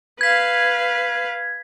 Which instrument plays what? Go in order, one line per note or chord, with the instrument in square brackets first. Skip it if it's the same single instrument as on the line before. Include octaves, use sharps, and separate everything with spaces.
[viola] B4 F5 [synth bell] G#6 B6